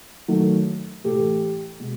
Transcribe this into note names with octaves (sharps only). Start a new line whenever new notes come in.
D#3 F#3 A3
A2 E3 A3 G4 A4
B2 G#3